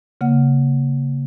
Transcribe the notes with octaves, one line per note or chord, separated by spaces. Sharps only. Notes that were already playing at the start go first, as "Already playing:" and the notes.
C#3 A#3 F#5